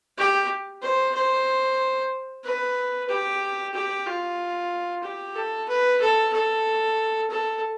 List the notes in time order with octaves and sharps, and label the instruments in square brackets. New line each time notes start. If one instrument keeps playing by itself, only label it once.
[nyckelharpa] G4
C5
C5
B4
G4
G4
F4
G4
A4
B4
A4
A4
A4